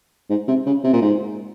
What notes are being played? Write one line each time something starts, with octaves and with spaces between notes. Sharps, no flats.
G#2
C3
C#3
C3
A#2
G#2